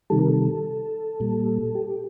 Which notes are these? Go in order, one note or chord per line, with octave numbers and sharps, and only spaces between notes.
C3 D#3 G3 A4
A#4
A4
A#2 G3
G4